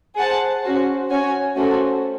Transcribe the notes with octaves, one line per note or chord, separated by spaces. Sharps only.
G#4 C5 F#5 A5
C#4 F#4 C5
C#4 F#4 C#5 G#5
A3 C#4 F#4 A4 C5